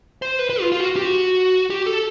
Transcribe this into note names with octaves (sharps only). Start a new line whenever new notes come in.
C5
B4
B4
F4
F4
F#4
G4
F#4
G4
A4